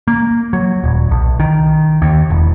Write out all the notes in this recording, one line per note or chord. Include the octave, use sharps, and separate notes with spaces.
A#3
F#3
D#1
B1
D#3
D#2
E1